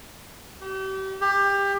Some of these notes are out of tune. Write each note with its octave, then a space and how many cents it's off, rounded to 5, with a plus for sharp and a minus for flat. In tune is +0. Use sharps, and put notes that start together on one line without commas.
G4 -35
G4 +25